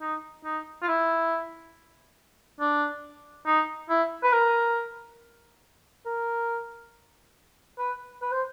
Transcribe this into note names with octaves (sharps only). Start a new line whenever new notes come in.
D#4
D#4
F4
E4
D4
D#4
E4
B4
A#4
A#4
B4
B4
C5